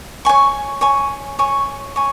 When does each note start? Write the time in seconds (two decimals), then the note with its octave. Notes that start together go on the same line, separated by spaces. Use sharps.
0.25 C#5 G#5 C#6
0.81 C#5 G#5 C#6
1.39 C#5 G#5 C#6
1.96 C#5 G#5